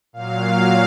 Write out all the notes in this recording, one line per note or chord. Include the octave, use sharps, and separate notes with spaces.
A#2 F#3 F5